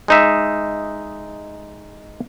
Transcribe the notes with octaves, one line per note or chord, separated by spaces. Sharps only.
G#3 D#4 E5